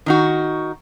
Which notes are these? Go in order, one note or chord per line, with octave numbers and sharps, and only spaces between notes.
D#3 D#4 F#4